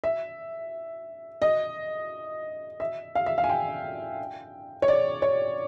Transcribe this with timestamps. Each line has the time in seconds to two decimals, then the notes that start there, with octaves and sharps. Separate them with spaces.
0.04 E5
1.42 D#5
2.80 E5
3.15 F5
3.26 E5
3.38 F5
3.44 G#5
3.49 G5
4.82 C#5
4.88 D5
5.22 C#5